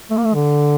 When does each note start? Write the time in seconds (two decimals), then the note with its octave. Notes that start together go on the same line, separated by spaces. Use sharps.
0.11 A3
0.17 A#3
0.25 A3
0.34 D3